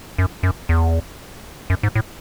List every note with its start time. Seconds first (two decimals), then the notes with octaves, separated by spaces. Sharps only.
0.18 F#2
0.43 F#2
0.69 E2
1.70 F#2
1.83 G#2
1.95 A2